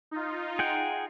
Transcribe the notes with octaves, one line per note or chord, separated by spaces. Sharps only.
D#4 F4
G#4 F#5 G5